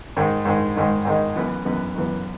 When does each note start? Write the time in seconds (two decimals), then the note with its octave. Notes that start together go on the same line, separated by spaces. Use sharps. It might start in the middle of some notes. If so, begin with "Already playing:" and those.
0.17 G#2 D#3 G#3
0.45 G#2 D#3 G#3
0.76 G#2 D#3 G#3
1.05 G#2 D#3 G#3
1.36 F#2 E3 B3
1.65 F#2 E3 B3
1.95 F#2 E3 B3